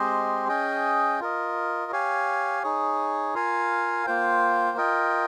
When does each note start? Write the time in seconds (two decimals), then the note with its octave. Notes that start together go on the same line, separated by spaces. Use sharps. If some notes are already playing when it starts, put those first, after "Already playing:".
Already playing: G#3 C4 G4 C5 D#5
0.48 C#4 G#4 D#5 G5
1.20 F4 A#4 D#5
1.92 G4 C#5 F5 G#5
2.63 D#4 G#4 C#5
3.34 F4 A#4 F5 G#5
4.06 A#3 F4 C5 G5
4.77 F4 A#4 D#5 G5